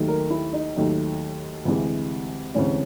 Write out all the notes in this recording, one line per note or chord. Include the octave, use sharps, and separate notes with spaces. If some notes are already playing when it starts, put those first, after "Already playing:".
Already playing: D#2 D#3 F#3 A3
A#4
E4
D#4
D#2 D#3 F#3 A3
D2 C3 E3 G#3
D2 C3 E3 G#3 C#4